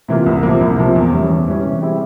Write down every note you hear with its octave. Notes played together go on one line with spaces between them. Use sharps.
C3 E3 A#3 F4
C2
C3 F3 A#3
C2
C3 F3 A#3
E2
E3 G3 C#4
E2
E3 G3 C#4
C3
G3 C4 E4 G#4